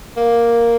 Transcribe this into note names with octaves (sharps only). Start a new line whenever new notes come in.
A#3